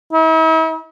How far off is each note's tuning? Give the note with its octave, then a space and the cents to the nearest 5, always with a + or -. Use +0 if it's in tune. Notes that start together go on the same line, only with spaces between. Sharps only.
E4 -45